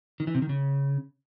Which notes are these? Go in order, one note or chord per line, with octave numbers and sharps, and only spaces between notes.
D#3
E3
C3
D#3
C#3